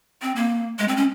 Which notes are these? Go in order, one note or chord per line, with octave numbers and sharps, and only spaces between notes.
C4
A#3
G#3
C4
C#4